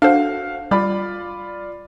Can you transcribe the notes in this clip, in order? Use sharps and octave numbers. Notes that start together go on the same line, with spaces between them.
D4 F#4 A4 C5 F5
G3 F4 D5 B5